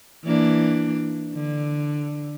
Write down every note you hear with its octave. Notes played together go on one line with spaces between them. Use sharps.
E3 A#3 D4
D3